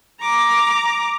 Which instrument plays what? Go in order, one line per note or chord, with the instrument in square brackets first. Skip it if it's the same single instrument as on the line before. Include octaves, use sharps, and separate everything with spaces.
[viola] A#5 D6